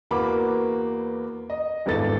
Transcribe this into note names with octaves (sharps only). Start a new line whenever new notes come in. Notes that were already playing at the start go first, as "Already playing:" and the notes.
E2 A#3 B3 F#4 B5 D6
D#5
G#1 E2 G2 A4 A6